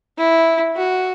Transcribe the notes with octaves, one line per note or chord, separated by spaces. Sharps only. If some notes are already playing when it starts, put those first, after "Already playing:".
E4
F#4